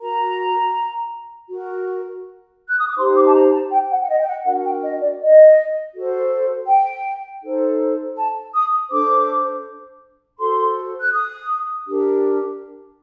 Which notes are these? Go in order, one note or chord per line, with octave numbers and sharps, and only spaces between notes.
F#4 A#4 A#5
F#4 A#4
F#6
D#6
D6
D#4 G4 C5 C6
D6
A5
A#5
A5
G5
F#5
F#5
D#5
G5
F#5
D4 F#4 A#4 F#5
G5
D#5
D5
D#5
F#4 A4 C5
G5
D#4 A4 C5
A5
D#6
D4 A4 C5 D6
F#4 A4 C5 C6
F#6
D#6
D4 G4 A#4